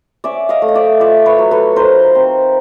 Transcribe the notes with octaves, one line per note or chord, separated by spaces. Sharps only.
C#4 D5 E5
D#5 F5
A3
D#5
D5 E5
F4 D5 E5
B4 C#5
F#3
A4 B4
D#4 A#4 C5
C4